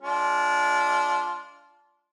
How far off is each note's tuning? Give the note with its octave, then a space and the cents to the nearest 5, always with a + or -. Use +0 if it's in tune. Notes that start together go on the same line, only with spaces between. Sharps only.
G#3 +0 D4 -25 F4 +0